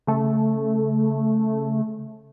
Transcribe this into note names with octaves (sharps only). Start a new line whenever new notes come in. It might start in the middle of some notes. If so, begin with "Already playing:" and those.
C#3 A3